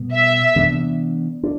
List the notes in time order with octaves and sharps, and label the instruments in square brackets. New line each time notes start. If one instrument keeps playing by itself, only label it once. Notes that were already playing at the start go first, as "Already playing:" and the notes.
Already playing: [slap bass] B2 G3 B3
[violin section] E5
[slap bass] C3 E3 B3 D4
D4